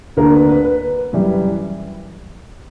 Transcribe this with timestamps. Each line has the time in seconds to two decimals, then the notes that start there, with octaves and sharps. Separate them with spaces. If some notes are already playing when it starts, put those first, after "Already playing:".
0.17 D2 D3 A#3 D4 A#4
0.34 B4
0.49 B4
0.65 B4
1.13 F#2 E3 G3